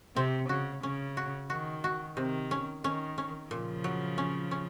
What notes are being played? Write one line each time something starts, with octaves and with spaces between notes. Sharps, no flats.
C3 C4
C#3 F#4
C#3 C#4
F#4
D#3 F#4
F#4
C3 D#3
C#4
D#3 C#4
C#4
A#2 C#3 F3
F#3
C#4
C#4